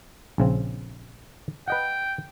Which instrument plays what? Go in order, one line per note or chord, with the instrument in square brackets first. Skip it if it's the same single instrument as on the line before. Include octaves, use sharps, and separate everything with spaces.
[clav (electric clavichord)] A#1 C#3 C4
[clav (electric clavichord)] B4 D#5 F#5 [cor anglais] G5